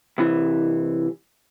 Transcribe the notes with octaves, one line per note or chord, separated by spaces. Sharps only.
C2 E3